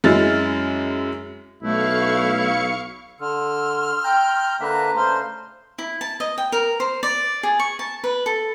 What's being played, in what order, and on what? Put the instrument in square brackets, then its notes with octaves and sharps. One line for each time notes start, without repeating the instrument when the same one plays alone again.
[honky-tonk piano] F#2 G#3 E4 F6 A6
[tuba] B1 [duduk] A3 [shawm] E4 [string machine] F5 C#6 C#7
[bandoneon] D3 [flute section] C6 E6 F6
[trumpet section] G5 [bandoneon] A#5 G6
[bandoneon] D3 A#3 E5 [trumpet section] D4 B4 A#5 [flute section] F#6
[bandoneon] C#3 A3 [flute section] C5 C6 F6
[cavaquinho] E4
A5
D#5
G5
A#4
C5
D5
G#4
C#6
A5
B4
A4